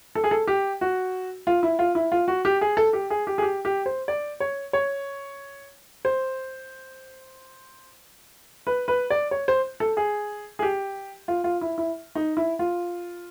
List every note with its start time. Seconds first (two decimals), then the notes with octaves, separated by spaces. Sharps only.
0.15 A4
0.24 G#4
0.31 A4
0.47 G4
0.81 F#4
1.47 F4
1.63 E4
1.79 F4
1.95 E4
2.12 F4
2.28 F#4
2.45 G4
2.61 G#4
2.77 A4
2.93 G4
3.10 G#4
3.27 G4
3.38 G#4
3.42 G4
3.65 G4
3.86 C5
4.08 D5
4.40 C#5
4.73 C#5
6.05 C5
8.67 B4
8.88 B4
9.10 D5
9.31 C#5
9.48 C5
9.80 A4
9.97 G#4
10.59 G#4
10.62 G4
11.28 F4
11.44 F4
11.61 E4
11.78 E4
12.15 D#4
12.37 E4
12.59 F4